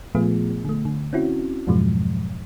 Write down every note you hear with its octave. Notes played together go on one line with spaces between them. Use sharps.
A#2 F3 A3 B3 F4 G#4
D3 A3
D3
C4 C#4 E4 F#4
F2 G#2 B2 F3 F#3 G#3